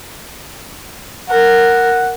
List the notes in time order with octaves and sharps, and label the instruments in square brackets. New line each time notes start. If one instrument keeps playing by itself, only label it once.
[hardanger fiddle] A#4 [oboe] F#5